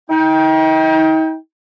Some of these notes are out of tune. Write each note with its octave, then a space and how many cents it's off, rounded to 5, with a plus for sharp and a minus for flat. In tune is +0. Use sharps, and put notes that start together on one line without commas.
D#4 +40 G5 +0